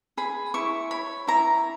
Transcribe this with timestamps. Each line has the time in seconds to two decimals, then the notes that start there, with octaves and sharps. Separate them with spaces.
0.17 G#4 B5
0.54 E4 C#6
0.91 C#5 B5
1.27 E4 A#5